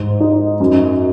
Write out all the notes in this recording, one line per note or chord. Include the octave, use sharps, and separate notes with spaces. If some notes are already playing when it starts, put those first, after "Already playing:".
Already playing: G#2
D#4
F#2